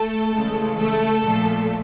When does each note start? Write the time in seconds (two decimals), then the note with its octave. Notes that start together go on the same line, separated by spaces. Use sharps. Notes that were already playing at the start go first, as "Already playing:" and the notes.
Already playing: A3 A4
0.32 C#3 E3 G#3
0.78 A3 A4
1.23 A#2 F3 A3